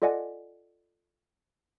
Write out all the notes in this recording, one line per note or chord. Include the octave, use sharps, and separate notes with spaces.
F4 A4 D5 D#5 F#5 G#5